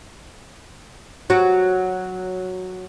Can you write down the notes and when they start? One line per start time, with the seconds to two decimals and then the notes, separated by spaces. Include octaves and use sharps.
1.30 F#3 F#4